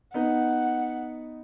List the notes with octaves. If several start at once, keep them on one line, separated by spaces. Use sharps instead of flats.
B3 D#4 F#5